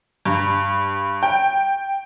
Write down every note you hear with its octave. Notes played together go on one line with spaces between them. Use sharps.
G2
G5